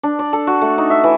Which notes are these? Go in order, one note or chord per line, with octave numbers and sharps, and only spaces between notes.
D4
D5
A4
F#4
A3
D#4
E5
E3